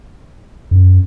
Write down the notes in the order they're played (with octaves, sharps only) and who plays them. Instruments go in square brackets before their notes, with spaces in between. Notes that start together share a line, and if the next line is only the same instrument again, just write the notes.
[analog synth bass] F#2